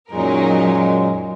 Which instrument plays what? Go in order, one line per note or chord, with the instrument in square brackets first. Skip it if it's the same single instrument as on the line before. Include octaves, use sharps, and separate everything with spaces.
[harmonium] F#2 A#2 G#3 [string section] F#3 D#4 A#4